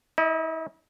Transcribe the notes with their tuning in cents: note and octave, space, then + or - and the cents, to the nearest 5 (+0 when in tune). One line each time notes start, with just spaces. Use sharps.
E4 -40 D#5 +0